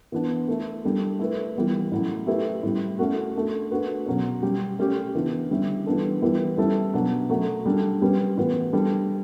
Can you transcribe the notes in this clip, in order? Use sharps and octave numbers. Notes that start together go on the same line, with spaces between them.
E3 B3 D4
A3 E4 A4
G3 D4 A4
A3 E4 B4
E3 G3 B3
A2 F#3 C#4
A3 E4 G4 B4
A2 G3 C#4
A3 C#4 F#4
A3 D4 A4
A3 D4 F#4 B4
B2 F#3 C#4
G3 C#4 G4
A3 C#4 G4
C#3 E3 B3 D4
D3 G3 C#4 E4
E3 G3 B3 D4 A4
E3 G3 B3 E4
G3 C#4 E4 A4
B2 F#3 B3 D4
F#3 A3 C#4 F#4 A4
G3 D4 A4
G3 C#4 G4 B4
A2 E3 B3 F#4 B4
G3 D4 A4